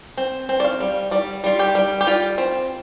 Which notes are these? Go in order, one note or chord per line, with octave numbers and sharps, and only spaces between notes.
C4
C4
D5
F5
G3
G3 D5
G3 F4
G4
G3
G4
G3 F4
C4